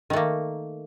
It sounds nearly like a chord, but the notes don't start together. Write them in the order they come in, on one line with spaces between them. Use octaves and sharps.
D#3 A3 A#3